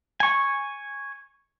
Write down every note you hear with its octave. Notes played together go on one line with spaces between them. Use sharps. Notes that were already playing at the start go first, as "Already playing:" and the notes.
G#5 C#6